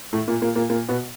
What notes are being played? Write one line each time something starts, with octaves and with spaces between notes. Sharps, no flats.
A2 A3
A#2 A#3
A#2 A#3
A#2 A#3
A#2 A#3
B2 B3